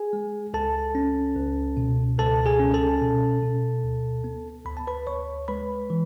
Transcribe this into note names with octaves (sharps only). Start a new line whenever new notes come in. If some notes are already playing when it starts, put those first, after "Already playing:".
Already playing: G#4 G#5
G#3
C#2 A4 A5
C#4
C#2
B2
C#2 A4 A5
G#4 G#5
C#4
A4 A5
B2
B2
D2
B3
D2 B5
A5
B4 B5
D2 C#5 C#6
G#3 B4 B5
E3